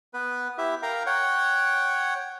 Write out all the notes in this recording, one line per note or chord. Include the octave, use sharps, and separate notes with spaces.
B3 B4
E4 G4 E5
A#4 F5 G5 A#5
C#5 F#5 G5